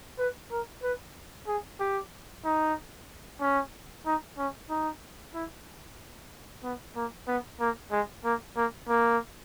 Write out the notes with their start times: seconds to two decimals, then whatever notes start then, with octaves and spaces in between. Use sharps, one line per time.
0.19 B4
0.51 A#4
0.83 B4
1.47 G#4
1.80 G4
2.45 D#4
3.41 C#4
4.06 D#4
4.38 C#4
4.70 D#4
5.34 E4
6.64 B3
6.96 A#3
7.28 B3
7.60 A#3
7.91 G#3
8.24 A#3
8.57 A#3
8.89 A#3